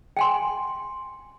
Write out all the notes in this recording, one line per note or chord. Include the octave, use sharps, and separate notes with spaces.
G5 G#5 C6